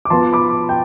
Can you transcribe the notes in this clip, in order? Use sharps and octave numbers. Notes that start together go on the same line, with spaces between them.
D6
F3 B3 F4 A5 C6
B5 D6
G5